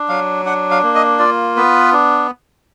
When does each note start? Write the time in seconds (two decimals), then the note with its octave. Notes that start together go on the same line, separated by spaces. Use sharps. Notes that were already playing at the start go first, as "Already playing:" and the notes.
Already playing: D4
0.09 F#3 F5
0.45 D4 F#5
0.71 F5
0.83 A#3
0.95 D#5
1.19 F4 D5
1.57 B3 B4
1.93 D4